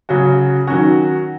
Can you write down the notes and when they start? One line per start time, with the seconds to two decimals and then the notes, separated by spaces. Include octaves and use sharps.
0.09 C#3 F#3 C#4 F#4
0.67 D#3 F#3 C#4 F#4